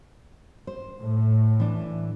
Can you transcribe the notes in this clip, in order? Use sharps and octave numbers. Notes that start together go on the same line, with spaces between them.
C5
A2
E3 D4